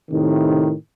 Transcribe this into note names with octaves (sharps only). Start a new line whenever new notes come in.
A2 C3 D#3